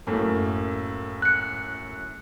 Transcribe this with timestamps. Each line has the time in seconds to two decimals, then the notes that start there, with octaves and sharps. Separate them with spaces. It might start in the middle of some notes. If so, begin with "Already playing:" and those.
0.07 F#2 A2 A#3
1.22 F#6 C#7